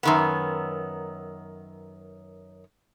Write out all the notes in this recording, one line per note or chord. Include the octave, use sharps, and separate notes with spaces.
F#2 D#3 B3